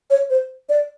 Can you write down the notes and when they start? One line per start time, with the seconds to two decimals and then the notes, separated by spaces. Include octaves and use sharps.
0.10 C#5
0.30 C5
0.69 D5